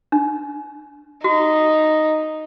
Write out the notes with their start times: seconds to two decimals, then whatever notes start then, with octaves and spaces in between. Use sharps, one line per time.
0.12 D4
1.24 D#4 F#4